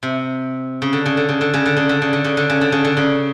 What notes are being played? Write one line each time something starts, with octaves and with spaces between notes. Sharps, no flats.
C3
C#3
D3
C#3
D3
C#3
D3
C#3
D3
C#3
D3
C#3
D3
C#3
D3
C#3
D3
C#3
D3
C#3